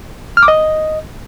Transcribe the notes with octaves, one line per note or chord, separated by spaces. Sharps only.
F6
D6
D#5